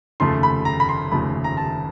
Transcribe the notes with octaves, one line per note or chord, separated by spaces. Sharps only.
F1 D#2 C#3 F3 A3 C6
B5
A#5
B5
C6
F1 D#2 C#3 F3 A3 B5
A#5
A5